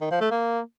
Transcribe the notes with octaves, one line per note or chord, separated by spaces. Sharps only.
D#3
F3
A3
A#3